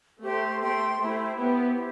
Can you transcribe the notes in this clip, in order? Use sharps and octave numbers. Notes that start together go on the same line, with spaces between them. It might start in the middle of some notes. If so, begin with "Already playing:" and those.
A3 G4 C5 G5 C6
A3 G4 C5 G5 C6
A3 E4 G4 C5 G5
B3 E4 G4 C5 G5
E4 G4 C5